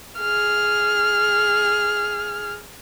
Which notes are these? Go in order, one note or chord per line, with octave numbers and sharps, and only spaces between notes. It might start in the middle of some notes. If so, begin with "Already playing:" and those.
G#4 F6